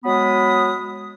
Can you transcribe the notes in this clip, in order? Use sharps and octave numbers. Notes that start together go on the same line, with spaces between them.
F#3 G#3 B3 B5 D#6